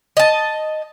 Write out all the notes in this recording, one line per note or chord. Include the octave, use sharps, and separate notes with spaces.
D#5 A5